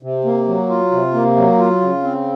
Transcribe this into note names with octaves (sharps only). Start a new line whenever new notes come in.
C3
A#3
F#3
F4
C3
A#3
F#3
F4
C#3
C4